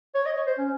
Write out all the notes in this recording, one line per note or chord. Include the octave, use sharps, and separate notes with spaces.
C#5
D#5
C#5
C5
C#4